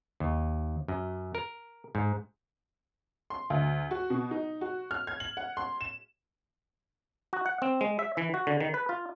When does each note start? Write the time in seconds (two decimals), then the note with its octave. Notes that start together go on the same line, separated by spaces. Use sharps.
0.20 D#2
0.88 F#2
1.35 A#4
1.95 G#2
3.30 C6
3.50 D2
3.91 F#4
4.10 B2
4.31 D#4
4.61 F#4
4.91 F6
5.07 G#6
5.20 F#7
5.37 F#5
5.57 C6
5.81 E7
7.33 F#4
7.46 F#5
7.62 C4
7.81 G#3
7.99 E5
8.17 E3
8.34 F#4
8.47 D3
8.60 D#3
8.74 B4
8.89 F4